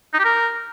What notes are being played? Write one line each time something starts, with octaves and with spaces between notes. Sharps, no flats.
D#4
G4
A#4